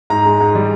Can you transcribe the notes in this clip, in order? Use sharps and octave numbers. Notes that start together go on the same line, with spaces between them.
G#2 A#5
G#3
G#2
G3